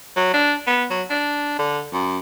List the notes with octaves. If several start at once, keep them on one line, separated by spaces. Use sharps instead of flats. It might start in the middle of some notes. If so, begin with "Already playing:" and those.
F#3
D4
B3
F#3
D4
D3
F#2